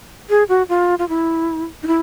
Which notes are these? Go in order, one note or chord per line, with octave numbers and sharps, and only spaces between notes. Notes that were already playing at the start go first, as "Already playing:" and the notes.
G#4
F#4
F4
F4
E4
D#4
E4